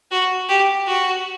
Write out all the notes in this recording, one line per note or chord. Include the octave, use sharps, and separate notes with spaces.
F#4
G4
F#4